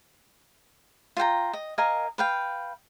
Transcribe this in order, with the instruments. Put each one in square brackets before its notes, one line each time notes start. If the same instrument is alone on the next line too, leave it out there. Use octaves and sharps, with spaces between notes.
[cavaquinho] F4 F5 G5 A#5
D#5
A#4 D#5 F5 G#5
B4 F5 G5